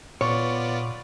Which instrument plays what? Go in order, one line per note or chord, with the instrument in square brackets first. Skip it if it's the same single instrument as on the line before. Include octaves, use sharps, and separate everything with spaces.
[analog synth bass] A#2 [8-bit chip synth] B3 F4 D5 [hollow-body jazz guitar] C#5 [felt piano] C#6